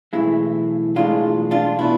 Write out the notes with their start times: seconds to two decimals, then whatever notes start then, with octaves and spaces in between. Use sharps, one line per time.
0.13 B1 A2 E3 G#3 E4
0.96 B1 A2 E3 G#3 D4 F4
1.51 D4 F4
1.79 B2 B3 D4 E4